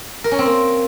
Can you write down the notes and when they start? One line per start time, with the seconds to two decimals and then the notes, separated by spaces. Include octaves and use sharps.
0.24 A#4
0.31 C#4
0.39 C4
0.46 A#3